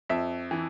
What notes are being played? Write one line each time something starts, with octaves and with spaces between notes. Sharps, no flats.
F2 E5
E3